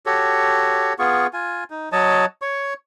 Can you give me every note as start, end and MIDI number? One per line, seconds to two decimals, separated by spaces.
0.06 0.93 66
0.06 0.93 67
0.06 0.93 69
0.06 0.93 73
0.99 1.27 59
0.99 1.27 65
0.99 1.27 68
0.99 1.27 85
1.33 1.64 65
1.33 1.64 80
1.70 1.89 63
1.92 2.25 54
1.92 2.25 73
1.92 2.25 75
1.92 2.25 81
2.42 2.74 73
2.42 2.74 85